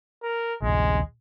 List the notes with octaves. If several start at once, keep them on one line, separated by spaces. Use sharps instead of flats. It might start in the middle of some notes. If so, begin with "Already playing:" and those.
A#4
A#1 D#2 G#3